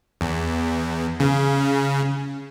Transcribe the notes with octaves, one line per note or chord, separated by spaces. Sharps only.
E2
C#3